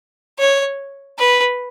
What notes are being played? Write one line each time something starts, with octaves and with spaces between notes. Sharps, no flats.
C#5
B4